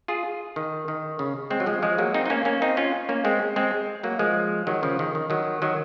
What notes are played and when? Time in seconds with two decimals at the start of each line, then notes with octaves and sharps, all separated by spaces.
0.08 F4 G#4
0.56 D#3
0.88 D#3
1.19 C#3
1.50 G#3 C4
1.60 F#3
1.66 F3 G#3
1.82 F3 G#3
1.98 F#3 A#3
2.14 C4 D#4
2.26 D#4
2.30 A#3 C#4
2.45 A#3 C#4
2.62 C4 D#4
2.77 C#4 F4
3.09 A#3 C#4
3.25 G#3 C4
3.56 G#3 C4
4.03 F#3 A#3
4.19 F3 G#3
4.67 D#3 F#3
4.83 C#3 F3
4.99 D#3
5.15 D#3
5.30 D#3 F#3
5.62 D#3 F#3